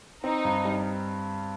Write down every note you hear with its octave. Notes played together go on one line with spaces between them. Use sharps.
C4 D#4
G2
G3